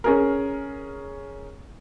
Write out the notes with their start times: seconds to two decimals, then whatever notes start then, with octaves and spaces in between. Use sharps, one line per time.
0.04 C#4 G#4 A#4